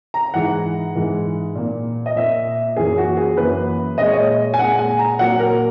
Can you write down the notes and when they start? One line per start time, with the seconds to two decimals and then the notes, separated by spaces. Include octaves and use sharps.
0.14 A#5
0.34 G#2 E3 G#3 F#5
0.96 G#2 E3 G#3
1.55 A#2 A#3
2.06 D#5
2.16 A#2 A#3 E5
2.76 F#2 E3 A#3 G#4
2.98 F#4
3.17 G#4
3.37 F#2 E3 A#3 B4
3.98 A#2 G#3 D#5
4.06 C#5
4.13 D#5
4.54 G#5
4.59 A#2 G#3 F#5
4.79 G#5
4.99 A#5
5.19 A#2 F#3 A#3 F#5
5.39 A#4